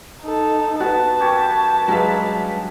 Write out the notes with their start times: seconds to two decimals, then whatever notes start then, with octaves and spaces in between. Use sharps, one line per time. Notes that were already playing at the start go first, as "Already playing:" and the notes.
0.22 D#4 A4
0.80 B3 F#4 A5
1.20 F#2 G4 C#5
1.88 G2 F#3 G#3 F5 B5